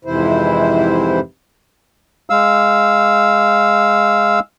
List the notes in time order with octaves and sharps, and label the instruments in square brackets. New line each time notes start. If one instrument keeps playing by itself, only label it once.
[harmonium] F2 G#2 C3 E3 E4 C5
[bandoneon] G#3 F5 E6